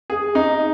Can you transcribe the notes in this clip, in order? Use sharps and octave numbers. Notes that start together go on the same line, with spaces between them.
G#4
D#4